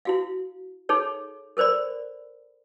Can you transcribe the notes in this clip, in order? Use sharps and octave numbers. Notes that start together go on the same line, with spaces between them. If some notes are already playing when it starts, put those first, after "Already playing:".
E4 F#4 F5
D#4 G#4 A4 C#5
A4 A#4 C5 D5 B5